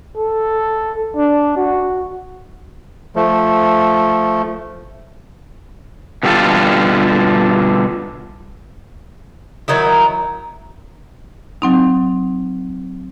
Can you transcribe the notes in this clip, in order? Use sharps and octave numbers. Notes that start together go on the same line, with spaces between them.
A4
D4
F#4
F3 A3
B2 D3 G3 A3 F4 A4
D#3 F#3 D#4 E4
F#3 C4 D#4